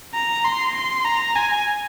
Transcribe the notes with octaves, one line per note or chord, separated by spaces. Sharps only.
A#5
C6
C6
A#5
G#5